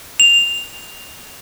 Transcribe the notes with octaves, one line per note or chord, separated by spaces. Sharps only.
F7